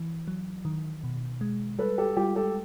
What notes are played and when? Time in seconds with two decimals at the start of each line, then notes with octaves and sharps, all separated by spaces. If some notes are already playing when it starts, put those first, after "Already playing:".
Already playing: E3
0.28 F#3
0.65 D#3
1.04 B2
1.41 G#3
1.79 G3 A4 B4
1.98 G4 A4
2.17 G3 F4 G4
2.36 G4 A4